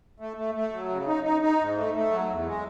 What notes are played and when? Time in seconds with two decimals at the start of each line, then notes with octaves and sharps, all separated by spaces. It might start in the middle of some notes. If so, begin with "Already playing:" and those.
0.20 A3
0.37 A3
0.55 A3
0.72 F#3
0.89 C#3
1.07 D#4
1.24 D#4
1.41 D#4
1.59 G#2
1.76 A3
1.94 A3
2.11 F#3
2.29 E2
2.45 G#3